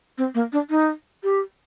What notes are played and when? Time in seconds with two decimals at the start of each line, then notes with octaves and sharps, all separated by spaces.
0.18 C4
0.35 A#3
0.53 D4
0.70 D#4
1.24 G4